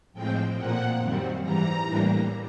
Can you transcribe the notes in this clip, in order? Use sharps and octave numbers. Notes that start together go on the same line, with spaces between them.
A2 F3 G#3 C4 G5
A#2 F3 A#3 F#5
F#2 D#3 G3 C4
G#2 E3 G3 A#5
A2 E3 G3 A#3 D4